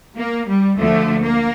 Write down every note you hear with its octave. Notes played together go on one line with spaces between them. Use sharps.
A#3
G3
D2 D3 F3 A3
A#3